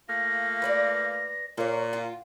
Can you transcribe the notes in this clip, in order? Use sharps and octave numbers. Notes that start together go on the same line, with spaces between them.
A3 A#3 F4 A#6
B4 C#5 D5
A#2 A#3 C#5
F4